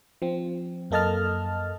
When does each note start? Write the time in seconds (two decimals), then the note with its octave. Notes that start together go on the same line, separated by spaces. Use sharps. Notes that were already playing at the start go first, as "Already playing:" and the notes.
0.22 F3 C4
0.91 F#2 A#3 A4 D#5 A5 F6